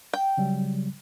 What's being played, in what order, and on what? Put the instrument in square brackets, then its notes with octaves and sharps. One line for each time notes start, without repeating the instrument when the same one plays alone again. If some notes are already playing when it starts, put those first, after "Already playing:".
[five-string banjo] G5
[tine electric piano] C#3 F#3 G3